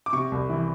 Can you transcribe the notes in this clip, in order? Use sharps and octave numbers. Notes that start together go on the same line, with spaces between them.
D6
C3 C#6
C2
E3